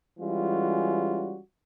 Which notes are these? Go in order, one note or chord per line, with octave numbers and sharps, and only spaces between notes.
E3 G3 G#3 C#4 F4 F#4